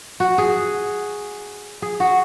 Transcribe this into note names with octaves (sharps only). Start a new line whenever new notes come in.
F#4
G#4
G#4
F#4